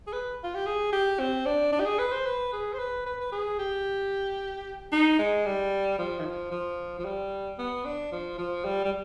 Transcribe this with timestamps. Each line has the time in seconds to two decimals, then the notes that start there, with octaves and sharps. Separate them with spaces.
0.07 G#4
0.13 B4
0.43 F4
0.55 G4
0.66 G#4
0.92 G4
1.19 C4
1.45 D4
1.72 D4
1.80 G4
1.85 G#4
1.99 B4
2.12 C5
2.26 B4
2.52 G#4
2.73 C5
2.79 B4
3.06 B4
3.20 B4
3.32 G#4
3.59 G4
4.92 D#4
5.19 G#3
5.46 G3
5.98 F3
6.19 D#3
6.25 F3
6.51 F3
6.99 F3
7.05 G3
7.58 B3
7.85 D4
8.12 F3
8.38 F3
8.65 G3
8.85 G3